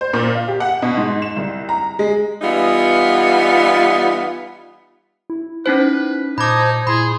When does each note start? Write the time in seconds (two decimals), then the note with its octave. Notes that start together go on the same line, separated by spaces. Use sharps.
0.01 C5
0.13 A#2
0.35 F5
0.48 G4
0.60 F#5
0.82 B2
0.97 G#2
1.22 E7
1.36 C2
1.69 A#5
1.99 G#3
2.42 E3 G3 B3 D#4 F4
5.30 E4
5.66 C#4 D#4 B4 C5
6.38 A#2 D#4 C5 A5 B5 D6 G#6
6.87 A#2 E4 G#4 B5 C6